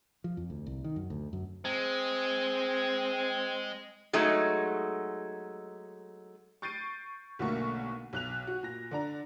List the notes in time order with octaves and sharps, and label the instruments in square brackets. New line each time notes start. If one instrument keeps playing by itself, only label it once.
[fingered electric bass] F3
F2
D2
C2
D#3
F#2
D2
F#2
[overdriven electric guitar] G#3 [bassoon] C4
[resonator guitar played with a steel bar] F#3 G#3 A3 D#4
[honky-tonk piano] C#6 G6 A6 C7 D7 D#7
B1 B2 D3 A3 A#3 C#6
B1 F#6 F7
F#4
A#2 A#6
D3 D4 A#5